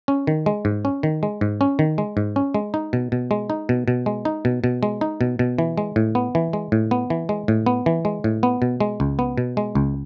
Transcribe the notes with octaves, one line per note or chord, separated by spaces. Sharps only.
C#4
D#3
G#3
G#2
C#4
D#3
G#3
G#2
C#4
D#3
G#3
G#2
C#4
G#3
D#4
B2
B2
G#3
D#4
B2
B2
G#3
D#4
B2
B2
G#3
D#4
B2
B2
E3
G#3
A2
B3
E3
G#3
A2
B3
E3
G#3
A2
B3
E3
G#3
A2
B3
B2
G#3
C#2
B3
B2
G#3
C#2